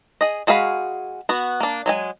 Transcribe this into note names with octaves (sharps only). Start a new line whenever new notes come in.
G#4 D#5
G#3 F#4 G#4 F5 B5
B3 F#4
A#3 D4
F#3 G#3 G#5